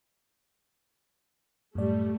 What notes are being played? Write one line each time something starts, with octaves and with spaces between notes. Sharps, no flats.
F#2 A2 G3 A3 D5